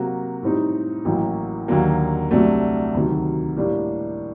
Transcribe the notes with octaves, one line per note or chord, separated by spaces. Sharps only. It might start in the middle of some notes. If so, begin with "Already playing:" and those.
Already playing: C3 F#3 A#3 F#4
A2 G3 C4 D#4
A1 A2 F#3 A#3
D#2 D3 F#3 A#3
C2 C3 F#3 A3 D4
D2 C3 D#3 F#3
A2 G3 A#3 D4